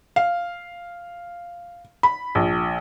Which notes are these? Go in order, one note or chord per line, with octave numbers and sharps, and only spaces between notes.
F5
B5
A#1